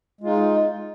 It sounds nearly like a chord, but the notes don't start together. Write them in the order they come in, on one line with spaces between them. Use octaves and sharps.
G#3 F4 D#4